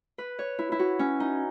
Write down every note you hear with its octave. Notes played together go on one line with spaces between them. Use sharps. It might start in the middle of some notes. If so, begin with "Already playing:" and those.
B4
C#5
E4
E4
F#4
C#4
D#4